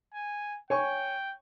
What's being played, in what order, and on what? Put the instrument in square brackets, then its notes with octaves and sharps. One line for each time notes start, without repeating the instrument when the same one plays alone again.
[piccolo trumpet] G#5
[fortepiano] C#5 G#5 C#6 [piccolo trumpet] G5